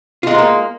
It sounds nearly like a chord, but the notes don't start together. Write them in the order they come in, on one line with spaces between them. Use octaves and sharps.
F4 G#3 D#4 B3 A#3